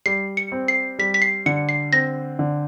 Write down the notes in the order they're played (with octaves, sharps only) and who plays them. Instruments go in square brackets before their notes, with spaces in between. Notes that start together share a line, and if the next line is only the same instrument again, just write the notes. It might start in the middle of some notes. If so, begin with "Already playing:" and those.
[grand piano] G3 [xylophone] C7
[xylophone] C#7
[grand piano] C4
[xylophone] C7
[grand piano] G3 [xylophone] B6
[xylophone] B6
C7
[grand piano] D3 [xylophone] C#7
[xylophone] C7
[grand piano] C4 [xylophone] A#6
[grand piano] D3